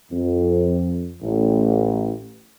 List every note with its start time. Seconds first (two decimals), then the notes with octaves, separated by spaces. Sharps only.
0.12 F2
1.22 A1